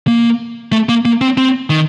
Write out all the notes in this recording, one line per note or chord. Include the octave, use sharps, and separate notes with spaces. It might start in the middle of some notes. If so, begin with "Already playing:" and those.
A#3
A3
A#3
A#3
C4
C4
D#3